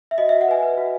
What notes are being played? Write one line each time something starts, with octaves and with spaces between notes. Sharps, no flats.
E5
F#4 D#5
F#4 E5
F#5
B4 G#5
B4
F#4